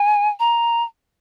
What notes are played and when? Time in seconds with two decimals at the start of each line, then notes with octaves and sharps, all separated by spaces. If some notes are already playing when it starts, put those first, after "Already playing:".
Already playing: G#5
0.40 A#5